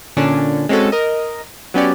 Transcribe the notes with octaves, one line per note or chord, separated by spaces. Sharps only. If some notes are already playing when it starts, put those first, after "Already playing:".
A#2 D3 C#4 D4
G#3 C4 C#4 F#4 A4
A#4 D#5
F#3 B3 C#4 G4 D5